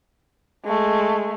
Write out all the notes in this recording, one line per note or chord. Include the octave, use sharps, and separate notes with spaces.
G#3 A3